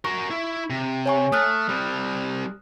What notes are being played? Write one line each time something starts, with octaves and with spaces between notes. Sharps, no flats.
F#4 A#4 C#6
E4
C3
C#5 G#5 C#6
A3 D#6 F6 F#6
G3 C4